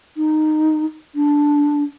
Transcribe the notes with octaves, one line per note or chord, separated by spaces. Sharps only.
D#4
D4